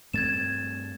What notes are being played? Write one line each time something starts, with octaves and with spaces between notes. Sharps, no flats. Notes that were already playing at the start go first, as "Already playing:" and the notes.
G2 A3 C4 G#6 A6 E7